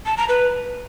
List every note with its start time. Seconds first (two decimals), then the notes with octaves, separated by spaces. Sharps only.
0.06 A5
0.17 A#5
0.29 B4